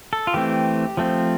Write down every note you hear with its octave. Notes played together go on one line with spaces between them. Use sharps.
A4
F4
E3 A3 C4 G4
F3 A3 C4